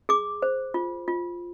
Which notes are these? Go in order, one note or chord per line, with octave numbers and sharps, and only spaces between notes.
G#4 D6
C5
F4
F4